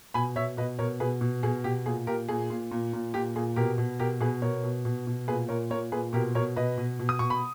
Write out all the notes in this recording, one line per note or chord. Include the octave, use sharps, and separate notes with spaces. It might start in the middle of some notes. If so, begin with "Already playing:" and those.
B2 G#5 B5
B2 C#5 E5
B2 B4 D#5
B2 A#4 C#5
B2 G#4 B4
B2
B2 G#4
B2 G4
A#2 G#4
A#2 G4 A#4
A#2 G#4
A#2
A#2
A#2
A#2 G4
A#2 G#4
B2 G4 A#4
B2
B2 G4 A#4
B2 G#4 B4
B2 A#4 C#5
B2
B2
B2
A#2 G#4 B4
A#2 A#4 C#5
A#2 A#4 C#5
A#2 G#4 B4
B2 G4 A#4
B2 A#4 C#5
B2 B4 D#5
B2
B2
D#6
B2 C#6
B5